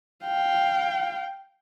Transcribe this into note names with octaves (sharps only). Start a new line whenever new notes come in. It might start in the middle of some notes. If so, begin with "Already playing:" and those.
F5 G5